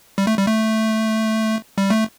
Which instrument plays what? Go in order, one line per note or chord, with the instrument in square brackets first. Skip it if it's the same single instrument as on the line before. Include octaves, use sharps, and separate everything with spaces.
[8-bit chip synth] G3
A3
G3
A3
G3
A3